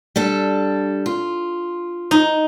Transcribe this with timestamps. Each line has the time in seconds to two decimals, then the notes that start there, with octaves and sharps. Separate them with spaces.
0.16 G3 D4 A4
1.06 F4
2.11 D#4